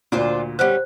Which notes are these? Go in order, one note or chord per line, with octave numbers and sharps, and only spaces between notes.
D2 A#2 D4 F4 C5
G3 B3 C#4 C5 F#6